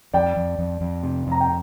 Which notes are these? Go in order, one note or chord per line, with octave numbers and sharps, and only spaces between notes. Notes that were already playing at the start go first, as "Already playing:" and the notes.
F2 D5 G5
F2
F2
F2
C3
F2 A#5
G5